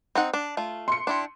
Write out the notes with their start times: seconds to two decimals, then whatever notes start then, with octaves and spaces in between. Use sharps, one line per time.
0.15 C4 D#4 F#5
0.34 D4
0.57 A3 F4
0.88 C6 C#7
1.07 D4 E4 G4